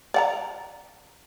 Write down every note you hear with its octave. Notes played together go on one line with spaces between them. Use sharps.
D5 F#5 A#5